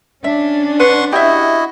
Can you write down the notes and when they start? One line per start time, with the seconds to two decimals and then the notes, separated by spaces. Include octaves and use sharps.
0.24 C#4 D4 E5
0.80 B4 F#5 C6 C#6
1.12 E4 F#4 G4 D#5 E5